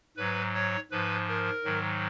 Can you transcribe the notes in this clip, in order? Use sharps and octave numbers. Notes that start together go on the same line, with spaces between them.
G#2 F#3 B4
C#5
G#2 F3 B4
A#4
G#2 D#3 F#3